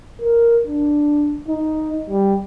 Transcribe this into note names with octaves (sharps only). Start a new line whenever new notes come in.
A#4
D4
D#4
G3